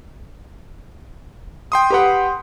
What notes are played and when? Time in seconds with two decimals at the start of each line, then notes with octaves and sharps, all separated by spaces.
1.72 G5 C6 D#6
1.90 G4 B4 F#5